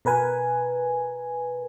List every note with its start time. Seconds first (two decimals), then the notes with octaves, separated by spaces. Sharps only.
0.05 B2 A#4 B4 G#5